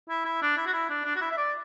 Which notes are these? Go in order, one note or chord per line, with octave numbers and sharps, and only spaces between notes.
E4
E4
D4
E4
F#4
E4
D4
D4
F#4
E4
E5
D5